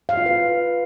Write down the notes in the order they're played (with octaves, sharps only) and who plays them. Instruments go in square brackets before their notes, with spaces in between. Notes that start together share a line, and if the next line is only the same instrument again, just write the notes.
[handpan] F5
F4
B4